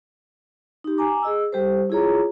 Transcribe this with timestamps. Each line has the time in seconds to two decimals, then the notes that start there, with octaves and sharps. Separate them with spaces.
0.84 D#4 G4
0.98 G#5 A#5 D6
1.22 G#4 D#5 E6
1.52 G3 G4 A4 C5
1.90 E4 F4 G#4 C#5 A#5